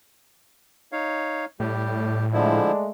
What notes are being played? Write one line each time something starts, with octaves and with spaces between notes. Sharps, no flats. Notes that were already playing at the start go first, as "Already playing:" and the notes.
D#4 C#5 F5
A2 G3 G4
D3 F3 G#3 A3 D4 E4